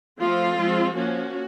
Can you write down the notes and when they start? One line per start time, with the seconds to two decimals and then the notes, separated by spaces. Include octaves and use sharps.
0.19 F3 A3 C4 F4
0.57 F3 G#3 C4
0.95 F3 A#3 C#4 F#4